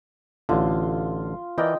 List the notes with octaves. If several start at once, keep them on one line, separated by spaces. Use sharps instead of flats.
A1 D3 F4
E3 A#4 D5 D#5 G5